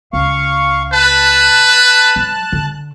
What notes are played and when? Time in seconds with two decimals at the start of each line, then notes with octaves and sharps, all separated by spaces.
0.13 C#2 F5 C#6
0.93 B4 A5 F#6
2.16 F#3
2.52 D3